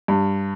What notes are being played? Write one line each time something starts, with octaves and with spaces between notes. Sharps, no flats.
G2